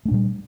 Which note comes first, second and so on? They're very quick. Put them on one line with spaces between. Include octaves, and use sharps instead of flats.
A3 D4 A#2 G3